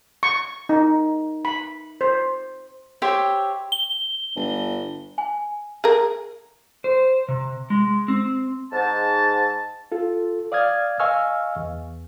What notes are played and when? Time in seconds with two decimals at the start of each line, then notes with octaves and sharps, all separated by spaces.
0.23 C#6
0.69 D#4
1.45 B5
2.01 C5
3.02 G4 C5 C#5 E5
3.72 G7
4.36 G1
5.18 G#5
5.84 G#4 A#4
6.84 C5
7.28 C3
7.70 G#3
8.08 C4
8.72 G#2 A5
9.92 F4 A4
10.52 D5 F5 D#6 F6 G#6
11.00 D#5 F5 G#5 C#6 E6 F6
11.56 E2